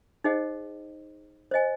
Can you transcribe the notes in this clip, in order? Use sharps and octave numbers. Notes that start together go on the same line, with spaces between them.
D#4 G#4 C5 D#5 F#5
C5 D#5 G#5